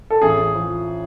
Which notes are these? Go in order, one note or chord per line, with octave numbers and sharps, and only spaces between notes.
A4
A1 G#4
F3